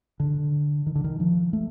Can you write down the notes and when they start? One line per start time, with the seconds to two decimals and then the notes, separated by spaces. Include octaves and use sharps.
0.20 D3
0.86 D#3
0.95 D3
1.04 D#3
1.20 F3
1.53 A3